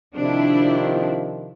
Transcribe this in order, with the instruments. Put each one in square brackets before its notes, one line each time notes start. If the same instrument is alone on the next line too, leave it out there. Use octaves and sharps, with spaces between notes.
[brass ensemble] C3 D#3 F3 [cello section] D4 E4